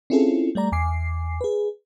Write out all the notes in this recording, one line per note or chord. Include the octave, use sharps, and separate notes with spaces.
C4 C#4 E4 F4 G#4 A4
G3 A3 D5 A#5
E2 G#5 D6 C7
G#4 B4